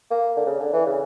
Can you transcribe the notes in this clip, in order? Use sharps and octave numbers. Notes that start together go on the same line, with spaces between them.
A#3
D3
C#3
D3
E3
C#3